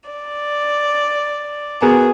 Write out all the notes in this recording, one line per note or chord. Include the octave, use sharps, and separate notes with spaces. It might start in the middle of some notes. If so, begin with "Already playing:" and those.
D5
B3 F#4 G#4 A#4